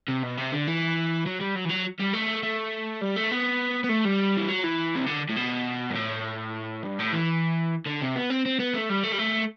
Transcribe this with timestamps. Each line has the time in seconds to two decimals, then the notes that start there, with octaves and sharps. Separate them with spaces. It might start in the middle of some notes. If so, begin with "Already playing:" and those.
0.09 C3
0.23 B2
0.38 C3
0.52 D3
0.67 E3
1.26 F#3
1.40 G3
1.55 F#3
1.65 E3
1.69 F#3
1.99 G3
2.13 A3
2.43 A3
3.01 G3
3.16 A3
3.31 B3
3.84 B3
3.89 A3
4.05 G3
4.37 E3
4.49 F#3
4.64 E3
4.96 C3
5.07 D3
5.30 A2
5.37 B2
5.90 G2
5.95 A2
6.83 G2
6.99 A2
7.12 E3
7.86 D3
8.01 C3
8.15 B3
8.30 C4
8.46 C4
8.60 B3
8.74 A3
8.90 G3
9.03 A3
9.12 G3
9.18 A3